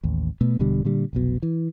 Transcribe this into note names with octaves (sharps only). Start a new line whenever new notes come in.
A1 D#2
B2 A3 B3
E1 B2 D3 G3
A#2 D3 G3
F1 B1 B2
E3